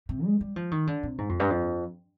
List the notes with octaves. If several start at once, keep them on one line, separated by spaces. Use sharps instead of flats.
C3
G#3
G3
F3
D#3
D3
C3
G#2
F2
G2
F2